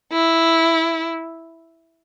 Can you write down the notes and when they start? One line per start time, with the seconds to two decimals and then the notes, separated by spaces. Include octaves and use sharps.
0.13 E4